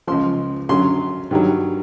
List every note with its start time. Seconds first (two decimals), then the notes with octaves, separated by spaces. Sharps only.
0.07 C#2 C#3 F3 C6
0.69 F#2 D3 F#3 C6
1.31 G2 D#3 F#3